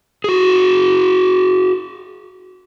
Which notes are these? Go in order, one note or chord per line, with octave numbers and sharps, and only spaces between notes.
F#4 G#4